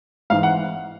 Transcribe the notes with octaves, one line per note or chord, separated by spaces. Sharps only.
G#1 G#2 E3 F5
F#5